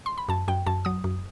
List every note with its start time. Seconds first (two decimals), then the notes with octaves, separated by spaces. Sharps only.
0.06 C6
0.18 B5
0.29 F#2 A5
0.48 F#2 G5
0.66 F#2 A5
0.85 F#3 D#6
1.04 F#2